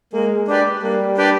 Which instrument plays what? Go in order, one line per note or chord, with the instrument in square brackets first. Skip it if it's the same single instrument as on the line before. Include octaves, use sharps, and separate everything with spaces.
[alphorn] G#3 [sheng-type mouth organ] A#3
[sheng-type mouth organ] D4 G4 B4 D5
[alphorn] G3 [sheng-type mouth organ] A#3
[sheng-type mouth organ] D4 G4 B4 D5